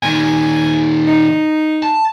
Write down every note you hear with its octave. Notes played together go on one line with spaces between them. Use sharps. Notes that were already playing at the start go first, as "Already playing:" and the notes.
A#2 D#3 G#5
D#4
A5